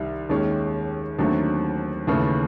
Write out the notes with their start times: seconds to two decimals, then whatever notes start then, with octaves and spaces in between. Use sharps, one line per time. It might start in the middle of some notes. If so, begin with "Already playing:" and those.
Already playing: C2 D#3 G3
0.29 D#2 D#3 G#3 C#4
1.19 D#2 D3 F#3 A3 C4
2.07 D#2 C#3 E3 A3